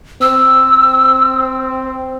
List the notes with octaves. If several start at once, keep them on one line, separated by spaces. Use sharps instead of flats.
C4 E6